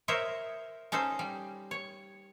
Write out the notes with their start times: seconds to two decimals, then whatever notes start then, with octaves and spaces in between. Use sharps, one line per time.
0.08 A#4 C5 C#5 D#5 E5
0.92 C#4 D#4 A4 C5
1.19 G3
1.71 C#5